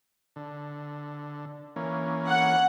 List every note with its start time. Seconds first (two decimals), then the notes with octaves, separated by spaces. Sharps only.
0.36 D3
1.76 E3 A#3 C#4
2.28 F#5